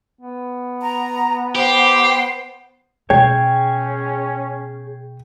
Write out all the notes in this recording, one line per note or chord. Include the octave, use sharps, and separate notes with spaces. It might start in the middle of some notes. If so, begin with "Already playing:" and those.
B3
A#5
G4 C5
B2 C#4 G#4 C#5 G5